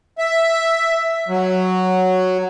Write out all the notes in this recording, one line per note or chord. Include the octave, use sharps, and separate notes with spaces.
E5
F#3